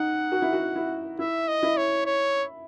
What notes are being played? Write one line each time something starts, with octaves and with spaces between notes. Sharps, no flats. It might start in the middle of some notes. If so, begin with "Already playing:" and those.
Already playing: D#4 F#5
F#4
E4
F#4
E4
E4 E5
D#5
E4
C#5
C#5